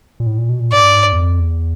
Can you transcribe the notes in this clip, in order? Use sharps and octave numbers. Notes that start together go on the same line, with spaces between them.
A#2
A2
A#2
B2
A#2
G#2 D5
G2
G#2
G2
E2
F2
E2